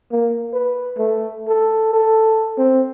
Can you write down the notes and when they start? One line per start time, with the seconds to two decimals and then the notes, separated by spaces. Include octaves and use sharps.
0.11 A#3
0.53 B4
0.98 A3
1.48 A4
1.93 A4
2.58 C4